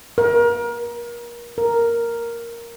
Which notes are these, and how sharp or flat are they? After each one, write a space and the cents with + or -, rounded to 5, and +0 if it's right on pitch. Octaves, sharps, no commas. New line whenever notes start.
A#4 +30
A#4 +0